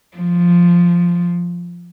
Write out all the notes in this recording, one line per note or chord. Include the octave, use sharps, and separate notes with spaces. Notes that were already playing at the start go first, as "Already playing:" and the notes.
F3